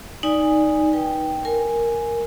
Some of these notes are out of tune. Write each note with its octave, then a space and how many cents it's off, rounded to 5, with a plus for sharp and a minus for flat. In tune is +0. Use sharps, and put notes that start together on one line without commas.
D#4 +0 D5 +0 G#5 -15
B4 -25 G5 +0
A#4 +0 G#5 +0